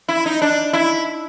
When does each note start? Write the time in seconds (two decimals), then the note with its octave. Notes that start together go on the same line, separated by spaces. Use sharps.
0.09 E4
0.26 D#4
0.42 D4
0.73 E4